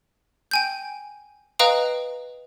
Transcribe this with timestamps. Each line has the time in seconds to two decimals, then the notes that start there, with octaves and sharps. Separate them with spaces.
0.51 G5 G#5 G6
1.59 B4 D#5 F5 G5 A#5 D#6